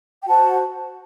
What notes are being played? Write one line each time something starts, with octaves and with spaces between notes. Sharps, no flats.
G5
F#4 C5 F#5 A5